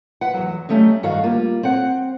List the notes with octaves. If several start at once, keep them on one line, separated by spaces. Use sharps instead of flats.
B4 F#5
E2 F#3
F#3 G3 A3 C#4 D#4
G2 D#3 F#4 F5
G3 A#3 F4
C4 F#5